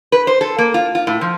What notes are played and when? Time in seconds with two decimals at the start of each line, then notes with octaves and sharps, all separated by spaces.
0.12 B4
0.27 C5
0.41 A4
0.58 A#3
0.74 F4
0.95 F4
1.07 A2
1.21 F3